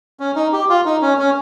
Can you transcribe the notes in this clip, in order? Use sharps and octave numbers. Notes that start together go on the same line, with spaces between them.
C#4
D#4
G4
F4
D#4
C#4
C#4